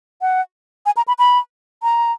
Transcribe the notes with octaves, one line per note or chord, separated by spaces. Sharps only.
F#5
G#5
A#5
B5
B5
A#5